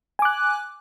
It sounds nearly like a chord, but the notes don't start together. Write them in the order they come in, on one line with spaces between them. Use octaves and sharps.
G#5 D6 F#6